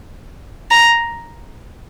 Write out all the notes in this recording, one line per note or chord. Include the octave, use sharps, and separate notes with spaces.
A#5